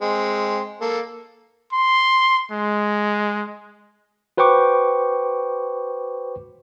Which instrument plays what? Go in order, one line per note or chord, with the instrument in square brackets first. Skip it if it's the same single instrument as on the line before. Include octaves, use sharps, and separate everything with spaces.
[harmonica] G#3 C4
A#3 A4
[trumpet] C6
G#3
[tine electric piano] F#4 B4 C5 G5 C#6 D6